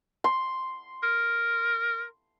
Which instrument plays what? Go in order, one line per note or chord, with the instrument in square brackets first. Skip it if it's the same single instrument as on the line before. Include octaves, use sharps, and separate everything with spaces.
[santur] C6
[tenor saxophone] A#4